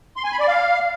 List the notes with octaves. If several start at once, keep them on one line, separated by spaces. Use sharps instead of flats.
C6
G#5
B5
D5
F5